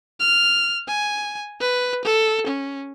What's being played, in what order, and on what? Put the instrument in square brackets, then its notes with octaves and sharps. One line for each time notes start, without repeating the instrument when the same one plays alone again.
[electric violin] F6
G#5
B4
A4
C#4